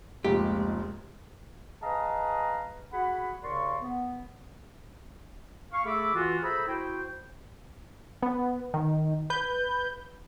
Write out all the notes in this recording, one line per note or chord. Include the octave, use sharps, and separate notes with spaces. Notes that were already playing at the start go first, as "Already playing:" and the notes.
F1 C#2 A#2 G#3 G4
G#4 B4 D#5 F5 A5 A#5
F#4 G#4 F#5 B5
D#2 C#3 A#4 D5 C6 C#6
B3
F5 C#6
A3 G#4 A4 E5 B5 D6
E3 F4 F#4
G#4 A4 C5 E5 A#5 B5
E4 F#4 C5 G5
B3
D#3
B4 G6